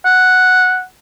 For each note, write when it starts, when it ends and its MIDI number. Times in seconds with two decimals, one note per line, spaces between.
0.05 0.83 78